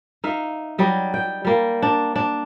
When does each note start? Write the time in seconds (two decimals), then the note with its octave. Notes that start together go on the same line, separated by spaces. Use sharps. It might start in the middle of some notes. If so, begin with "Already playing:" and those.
0.24 D#4 E5 F5
0.78 F#3 G3 D#5
1.14 G5
1.45 G3 A#3
1.82 D4
2.16 D4